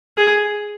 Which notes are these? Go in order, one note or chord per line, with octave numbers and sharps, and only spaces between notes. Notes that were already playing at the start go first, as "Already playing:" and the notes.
G#4